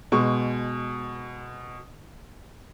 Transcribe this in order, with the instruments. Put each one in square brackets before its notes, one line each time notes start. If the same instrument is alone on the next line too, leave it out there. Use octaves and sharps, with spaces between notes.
[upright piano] B2 G#3 C#6